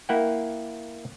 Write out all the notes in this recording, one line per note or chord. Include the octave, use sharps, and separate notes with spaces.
A#3 E4 F#5 G5